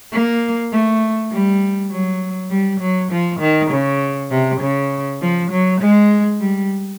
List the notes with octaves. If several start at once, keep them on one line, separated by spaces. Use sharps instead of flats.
A#3
A3
G3
F#3
G3
F#3
F3
D#3
C#3
C3
C#3
F3
F#3
G#3
G3